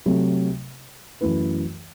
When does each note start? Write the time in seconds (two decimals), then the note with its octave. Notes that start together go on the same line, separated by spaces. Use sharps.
0.06 C3 F#3 A3
1.21 F#2 E3 A3 E4 B4